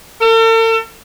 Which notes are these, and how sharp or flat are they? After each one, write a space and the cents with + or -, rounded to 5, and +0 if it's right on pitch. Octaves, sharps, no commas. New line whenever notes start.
A4 +45